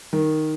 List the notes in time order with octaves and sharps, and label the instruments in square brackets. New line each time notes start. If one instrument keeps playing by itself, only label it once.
[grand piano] D#3